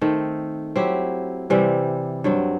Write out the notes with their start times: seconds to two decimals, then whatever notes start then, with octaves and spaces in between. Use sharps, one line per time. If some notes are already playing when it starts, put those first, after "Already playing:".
0.01 D#3 A3 C4
0.76 F#3 C4 E4 G4
1.50 C3 E3 G3 C4
2.24 G2 F#3 C4